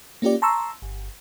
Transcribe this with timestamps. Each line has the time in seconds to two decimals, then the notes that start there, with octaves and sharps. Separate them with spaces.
0.22 A#3 C#4 F4 G4 D5
0.42 A5 A#5 C6 C#6 E6
0.82 G1